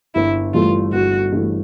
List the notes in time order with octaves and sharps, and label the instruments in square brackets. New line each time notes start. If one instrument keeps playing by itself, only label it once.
[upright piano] G1 [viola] E4
[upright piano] G2 E3 A3 [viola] F4
[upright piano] G1 [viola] F#4
[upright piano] G2 E3 A3